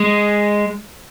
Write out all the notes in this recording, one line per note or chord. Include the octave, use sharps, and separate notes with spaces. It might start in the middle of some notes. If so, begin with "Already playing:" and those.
Already playing: G#3